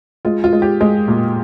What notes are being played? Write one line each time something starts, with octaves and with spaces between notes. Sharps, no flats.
G#3 F4
F4
G#3
G4
G#3 G#4
A#2